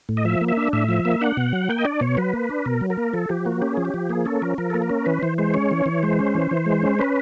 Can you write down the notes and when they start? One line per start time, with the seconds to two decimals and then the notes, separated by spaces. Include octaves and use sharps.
0.09 A2
0.17 D#5
0.25 F3 E5
0.41 A#3
0.48 E5
0.57 D4
0.73 A2 E5
0.89 F3
1.05 A#3
1.21 D4 F#5
1.37 B2
1.53 F#3
1.69 A#3 G5
1.78 D#5
1.85 D4 D5
2.01 B2 C#5
2.17 F#3 B4
2.34 A#3
2.50 D4
2.65 B2 A#4
2.81 F#3
2.90 A#4
2.97 A#3
3.14 F3 A4
3.29 F3 G4
3.45 A#3 F#4
3.62 C#4 G4
3.74 F3 G#4
3.85 G4
3.94 F3
4.09 A#3 G#4
4.26 C#4 A4
4.42 F3 A#4
4.58 F3 A#4
4.70 A#3 A4
4.82 A#4
4.90 C#4
5.06 E3 B4
5.23 E3 C5
5.38 G#3 C5
5.54 C#4 C#5
5.71 E3
5.86 E3
6.03 G#3 C5
6.19 C#4
6.35 E3
6.51 E3
6.66 G#3
6.83 C#4
6.99 C#4 B4